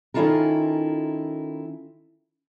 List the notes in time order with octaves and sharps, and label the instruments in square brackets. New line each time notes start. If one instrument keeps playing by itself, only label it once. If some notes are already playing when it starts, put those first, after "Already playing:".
[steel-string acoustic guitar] D#3 C#4 E4 F4 A4 A#4